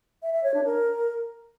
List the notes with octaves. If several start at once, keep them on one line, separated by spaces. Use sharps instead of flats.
E5
E5
C#5
D4
A#4